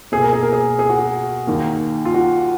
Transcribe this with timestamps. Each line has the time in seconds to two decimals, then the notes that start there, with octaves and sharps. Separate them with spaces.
0.12 B2 A#3 G#4
0.22 A#4
0.33 G#4
0.43 A#4
0.53 G#4
0.79 G#4
0.90 F#4
0.99 G#4
1.47 D#2 D#3 A#3
2.05 F4
2.14 F#4